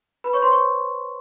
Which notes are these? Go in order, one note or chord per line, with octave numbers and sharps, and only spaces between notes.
B4 B5
C#5 C#6
C5 C6
C#5 C#6